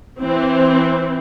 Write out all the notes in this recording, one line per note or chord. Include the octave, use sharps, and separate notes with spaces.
E3 C4